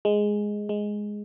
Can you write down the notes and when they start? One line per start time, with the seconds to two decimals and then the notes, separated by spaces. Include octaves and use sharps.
0.05 G#3
0.69 G#3